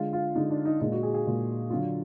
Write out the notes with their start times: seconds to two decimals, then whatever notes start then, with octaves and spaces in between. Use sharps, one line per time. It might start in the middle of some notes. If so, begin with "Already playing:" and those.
Already playing: D3 G#3 F4
0.13 F4
0.35 D3 G#3 D#4
0.50 D4
0.65 D#4
0.81 A#2 G#3 D#4
0.92 F#4
1.03 G#4
1.14 G#4
1.25 A#2 G#3
1.70 D3 F#3 F4